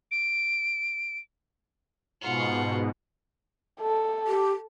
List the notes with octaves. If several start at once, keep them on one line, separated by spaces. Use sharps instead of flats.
D7
G#2 B2 F4 F#5
A4
G4